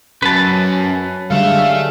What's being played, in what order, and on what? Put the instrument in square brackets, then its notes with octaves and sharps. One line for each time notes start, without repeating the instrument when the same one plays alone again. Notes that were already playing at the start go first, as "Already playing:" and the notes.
[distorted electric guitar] F#2 [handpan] F#3 [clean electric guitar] B4 A5
[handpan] D3 G3 G#3 [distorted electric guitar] A4 E5 [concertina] F5